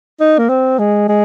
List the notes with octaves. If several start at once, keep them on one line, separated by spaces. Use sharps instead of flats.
D#4
A#3
C4
G#3
G#3